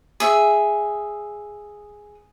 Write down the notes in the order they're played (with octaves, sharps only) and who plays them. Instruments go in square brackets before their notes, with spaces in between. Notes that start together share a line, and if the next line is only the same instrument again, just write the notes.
[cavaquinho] G#4 E5